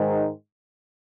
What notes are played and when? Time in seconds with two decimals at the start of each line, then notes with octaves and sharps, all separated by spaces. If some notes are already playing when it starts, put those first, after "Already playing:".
Already playing: G#2 D#3 G#3